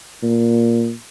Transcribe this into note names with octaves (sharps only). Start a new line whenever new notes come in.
A#2